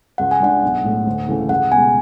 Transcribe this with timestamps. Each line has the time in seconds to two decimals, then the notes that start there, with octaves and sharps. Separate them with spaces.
0.18 C#2 F#5
0.31 G#5
0.40 C#3 G#3 D4 F#5
0.63 B1
0.84 A2 G#3
1.07 D2
1.28 C#3 E3 A3
1.49 C#2 F#5
1.72 B2 G#3 G#5